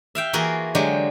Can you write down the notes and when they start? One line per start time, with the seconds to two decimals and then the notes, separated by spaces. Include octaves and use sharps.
0.15 E5 F5 G5
0.33 E3 A#3 F4 F#4 G#4 A#4
0.75 D3 F#3 G#3 G4